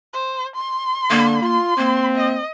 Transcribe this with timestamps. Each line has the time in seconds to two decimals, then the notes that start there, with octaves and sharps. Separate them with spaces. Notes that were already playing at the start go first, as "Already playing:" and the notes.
0.13 C5
0.56 C6
1.10 D3 A#3
1.42 F4 C6
1.78 A#3 C4
2.15 D#5